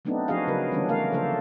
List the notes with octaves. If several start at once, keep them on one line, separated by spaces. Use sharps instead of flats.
F#3 A3 B3 C4 D4 D#4
F3 D4 F#4 G#4 D#5 F5
C#3 F#3 A#4 B4
D3 E3 G3 B3 C#4 D4
A3 A#3 F#4 A#4 F5
C#3 F3 A#3 D4 A4 C5